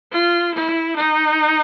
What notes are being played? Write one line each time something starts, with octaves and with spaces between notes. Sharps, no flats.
F4
E4
D#4